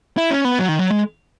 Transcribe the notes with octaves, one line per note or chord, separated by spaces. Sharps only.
E4
C#4
B3
F#3
D#3
F#3
G#3